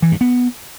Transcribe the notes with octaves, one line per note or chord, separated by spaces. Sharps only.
E3
G2
B3